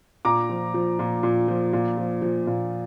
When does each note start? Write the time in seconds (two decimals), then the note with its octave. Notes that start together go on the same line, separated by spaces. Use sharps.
0.25 A#2 A#5 D6
0.49 F3
0.74 F3
0.99 A#2
1.23 A#2
1.48 F3
1.73 A#2
1.98 F3
2.22 F3
2.47 A#2